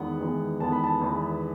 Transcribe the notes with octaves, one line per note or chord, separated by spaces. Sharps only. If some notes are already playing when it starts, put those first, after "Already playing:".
Already playing: E2 D#3 G#3 B3 F#5
E2 D#3 G#3 B3
E2 D#3 G#3 B3 A5
B5
A5
E2 D#3 G#3 B3